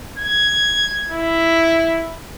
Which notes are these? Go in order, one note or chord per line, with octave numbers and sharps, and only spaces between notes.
G#6
E4